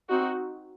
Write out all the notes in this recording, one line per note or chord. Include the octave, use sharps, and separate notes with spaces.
C4 D#4 F#4